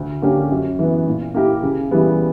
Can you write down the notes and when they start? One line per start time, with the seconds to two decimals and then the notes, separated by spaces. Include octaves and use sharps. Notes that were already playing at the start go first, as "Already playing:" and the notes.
Already playing: D2
0.22 D3 A#3 C#4 G4
0.51 F#2
0.79 E3 B3
1.07 A#2
1.35 A#3 E4 G4
1.63 C#3
1.91 E3 G3 B3